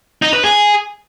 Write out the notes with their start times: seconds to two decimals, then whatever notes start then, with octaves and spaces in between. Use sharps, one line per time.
0.22 D#4
0.33 B4
0.44 G#4